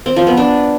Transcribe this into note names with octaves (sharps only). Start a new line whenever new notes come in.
C4
F3
B3
D4